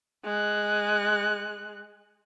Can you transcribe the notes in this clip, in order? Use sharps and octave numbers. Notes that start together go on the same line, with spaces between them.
G#3 F#6